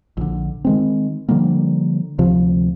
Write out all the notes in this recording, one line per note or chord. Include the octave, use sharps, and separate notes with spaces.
A#1 D3
D#3 G#3 C4
D3 F3 G3 A#3
D2 C3 F3